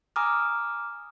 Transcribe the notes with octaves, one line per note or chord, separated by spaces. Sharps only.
G#5 A#5 D6 D#6 F6